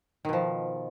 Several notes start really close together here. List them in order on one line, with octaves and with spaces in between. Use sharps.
D#3 B2 F3